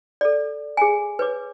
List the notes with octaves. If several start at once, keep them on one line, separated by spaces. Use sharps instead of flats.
A4 D5
G#4 G#5
B4 C#5 D6